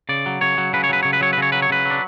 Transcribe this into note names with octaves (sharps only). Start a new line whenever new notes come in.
C#3 D5
F#3
C#3 C#5
F#3
C#3 B4
C#5
F#3 B4
C#3 C#5
B4
F#3 C#5
B4
C#3 C#5
F#3 B4
C#5
C#3 B4
F#3
D4